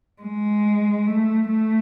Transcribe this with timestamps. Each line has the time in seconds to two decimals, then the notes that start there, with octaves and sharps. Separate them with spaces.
0.22 G#3
1.07 A3
1.48 A3